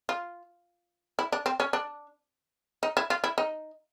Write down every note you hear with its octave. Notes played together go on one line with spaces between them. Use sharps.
F4
E4
D4
C4
C#4
D4
D#4
E4
F4
E4
D#4